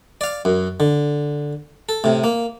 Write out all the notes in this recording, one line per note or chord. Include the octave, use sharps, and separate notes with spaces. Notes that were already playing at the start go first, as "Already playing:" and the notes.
D5 F5
F#2
D3
A4
A2 C3
A#3